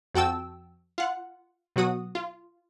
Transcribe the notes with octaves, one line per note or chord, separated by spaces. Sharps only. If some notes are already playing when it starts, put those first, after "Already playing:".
F2 F#4 G5 A5 E6
F4 F#5
B2 F#3 F#4 D#6
F4